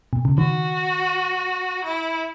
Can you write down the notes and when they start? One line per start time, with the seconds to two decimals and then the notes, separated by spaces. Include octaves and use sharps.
0.13 B2
0.25 C#3
0.38 D#3 F#4
1.85 E4